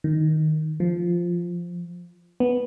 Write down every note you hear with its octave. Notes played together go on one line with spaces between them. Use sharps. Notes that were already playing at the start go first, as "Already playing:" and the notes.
D#3
F3
B3